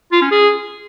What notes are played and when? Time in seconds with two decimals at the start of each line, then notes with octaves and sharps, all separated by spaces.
0.12 F4
0.22 C#4
0.31 G#4